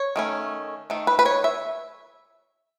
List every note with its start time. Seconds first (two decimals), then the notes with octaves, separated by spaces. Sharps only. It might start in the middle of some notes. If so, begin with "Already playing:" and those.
Already playing: C#5
0.16 D#3 A3 C#4
0.90 D#3 A3
1.07 B4
1.19 B4
1.26 C#5
1.44 E5